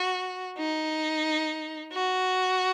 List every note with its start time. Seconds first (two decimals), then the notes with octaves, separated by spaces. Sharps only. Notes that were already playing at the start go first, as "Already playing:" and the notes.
Already playing: F#4
0.58 D#4
1.93 F#4